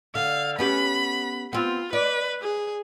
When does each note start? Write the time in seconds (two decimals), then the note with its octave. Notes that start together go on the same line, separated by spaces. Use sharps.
0.15 D3 F5
0.59 B3 C#4 G4 B5
1.53 B3 C4 F4
1.93 B4 D5
2.41 G#4